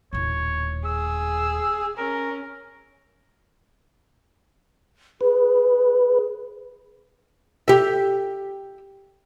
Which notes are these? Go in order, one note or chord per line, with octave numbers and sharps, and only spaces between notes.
D#1 A2 C#5
G#4 E6
C#4 A#4
G#4 B4
G4 E5